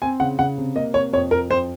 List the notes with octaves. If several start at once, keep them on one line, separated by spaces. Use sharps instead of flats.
C4 G#5
C#3 F#5
C#3 F#5
C3
A#3 D#5
C3 C#5
F2 C#5
F2 A#4
F2 C5